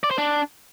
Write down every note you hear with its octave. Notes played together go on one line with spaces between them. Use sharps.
D5
C5
D4